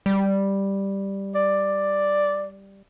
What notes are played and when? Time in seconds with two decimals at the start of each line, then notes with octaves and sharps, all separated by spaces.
0.06 G3
1.35 D5